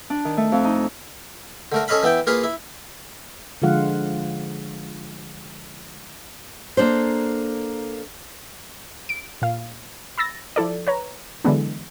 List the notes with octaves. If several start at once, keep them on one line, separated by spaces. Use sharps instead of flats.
D4
D#3
A3
F2
D#4
D3 A3 A#4
C#4 A4 C#5 D#5 F5 B5
E3 B3 E4 G5
A#3 F4 G#4 B4 F5
E4
D3 F3 G#3 F4 F5 F#5
A#3 D4 A4 C5
D7
A#2 F5
B5 E6 A6 A#6
F3 E4 A4 D5
B4 C#5 A#5
D3 E3 F#3 G#3 B3 D4